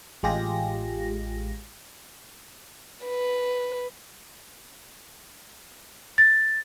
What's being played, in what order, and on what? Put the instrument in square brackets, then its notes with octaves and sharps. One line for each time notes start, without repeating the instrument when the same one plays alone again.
[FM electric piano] A1 G#3 F4 G4 G#4 A#6
[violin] B4
[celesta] A6